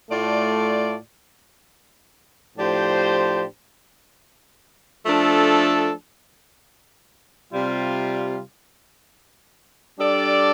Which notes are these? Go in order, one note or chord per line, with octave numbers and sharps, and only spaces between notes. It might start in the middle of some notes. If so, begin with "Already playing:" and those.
A2 A3 F4 D5
A2 F3 D4 G4 C5
F3 A3 D4 A4
C3 G3 F4
G3 D4 A4 D5